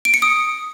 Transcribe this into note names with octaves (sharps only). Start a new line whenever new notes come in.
D7
C#7
D#6